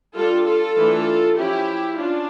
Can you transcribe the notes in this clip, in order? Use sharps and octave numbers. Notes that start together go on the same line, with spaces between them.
G3 D4 F4 A4
F4 A4
E3 A3 D4
F3 C#4 E4 G4
C#4 D4 F4